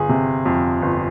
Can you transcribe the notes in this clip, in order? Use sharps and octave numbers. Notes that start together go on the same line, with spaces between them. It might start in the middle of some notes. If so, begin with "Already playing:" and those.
Already playing: G1 G#4
C3
F2
G1